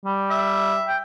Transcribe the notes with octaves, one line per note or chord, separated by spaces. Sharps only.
G3
E5
G5